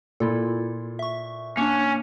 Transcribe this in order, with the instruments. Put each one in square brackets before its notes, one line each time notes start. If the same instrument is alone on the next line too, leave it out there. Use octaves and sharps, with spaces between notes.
[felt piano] A#2 [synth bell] E4 F4 A4
[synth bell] E5 C#6
[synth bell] A#3 D4 [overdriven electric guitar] C#4